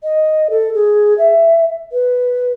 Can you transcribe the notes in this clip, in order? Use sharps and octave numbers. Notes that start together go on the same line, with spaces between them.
D#5
A4
G#4
E5
B4